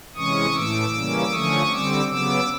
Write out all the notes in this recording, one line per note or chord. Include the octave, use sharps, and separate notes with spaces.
C3 E3 G#3 C#4 C#6 D#6
A2 E3 A3 D6 E6
C#3 E3 G3 A#3 C#4
D3 F3 A3 C#4 C#6 D#6
D3 G3 C4 D6 E6
C#3 F#3 B3 D6 E6